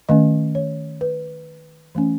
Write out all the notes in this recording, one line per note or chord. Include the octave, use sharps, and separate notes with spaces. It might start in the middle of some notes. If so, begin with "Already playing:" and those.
D#3 A3 C#4 D#5
C#5
B4
E3 A3 C#4